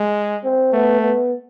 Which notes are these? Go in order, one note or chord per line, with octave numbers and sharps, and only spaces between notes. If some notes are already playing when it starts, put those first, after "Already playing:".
Already playing: G#3
C4
A3 B3
B3